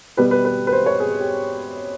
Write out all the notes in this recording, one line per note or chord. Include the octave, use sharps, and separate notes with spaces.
B2 G3 B3 B4
B4
B4
B4
C5
C#5
G#4
G4